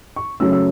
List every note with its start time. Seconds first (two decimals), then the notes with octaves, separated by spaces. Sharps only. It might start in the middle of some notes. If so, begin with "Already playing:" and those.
0.16 C#6
0.40 C#3 F#3 A3 C#4 E6
0.52 E6